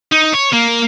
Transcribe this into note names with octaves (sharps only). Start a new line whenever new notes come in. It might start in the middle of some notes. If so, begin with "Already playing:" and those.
D#4
C#5
A#3